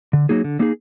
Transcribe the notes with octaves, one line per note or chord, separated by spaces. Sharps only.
D3
F#3 A#3 D#4 G#4
D3
F#3 A#3 D#4 G#4